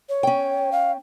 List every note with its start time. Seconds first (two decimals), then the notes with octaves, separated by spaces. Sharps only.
0.09 C#5
0.23 C#4 G5
0.72 F5